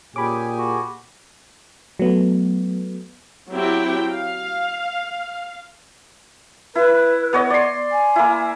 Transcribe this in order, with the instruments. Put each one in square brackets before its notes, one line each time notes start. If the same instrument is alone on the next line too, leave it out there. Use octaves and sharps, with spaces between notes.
[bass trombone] A#2 [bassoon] C#4 [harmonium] G4 G#4 G#5 [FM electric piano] B5 D6
[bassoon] F#4
[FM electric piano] F#3 A3 B3
[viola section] F#3 C4 E4 G4 G5
F5
[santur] E4 [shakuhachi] B4
[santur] B3 C#5 D#5
D5 C6
[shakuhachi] G#5
[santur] A#3 E4